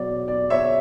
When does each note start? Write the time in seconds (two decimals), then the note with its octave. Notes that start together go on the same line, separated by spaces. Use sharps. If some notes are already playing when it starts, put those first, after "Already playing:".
Already playing: B2 F#3 C#5 D5
0.28 D5
0.50 C#5 E5